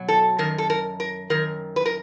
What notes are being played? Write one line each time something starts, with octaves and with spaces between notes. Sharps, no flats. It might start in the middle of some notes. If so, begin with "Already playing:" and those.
Already playing: B2 F#3
A4
F#2 D#3 A#4
A4
A#4
A#4
F#2 D#3 A#4
B4
A#4